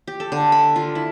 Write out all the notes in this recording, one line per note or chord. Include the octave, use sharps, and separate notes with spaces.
G4
A4
D3
B5
F4
E4